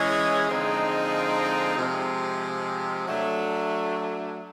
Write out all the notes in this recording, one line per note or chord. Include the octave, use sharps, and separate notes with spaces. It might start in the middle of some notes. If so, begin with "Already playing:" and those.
Already playing: E3 G#3 C#4
D3 F3 G#3 C4 D#4
C3 F3 G#3
F#3 A3 D4